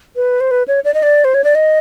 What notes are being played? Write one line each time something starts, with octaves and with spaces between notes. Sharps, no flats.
B4
C5
B4
C#5
D5
D#5
D5
C5
C#5
D5
D#5